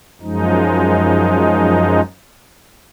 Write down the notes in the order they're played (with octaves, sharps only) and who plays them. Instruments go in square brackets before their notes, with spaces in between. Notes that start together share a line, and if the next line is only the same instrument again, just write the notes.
[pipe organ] F#2 F3 G#3 D#4